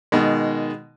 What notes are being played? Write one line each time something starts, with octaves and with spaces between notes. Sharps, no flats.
B2 D#3 G#3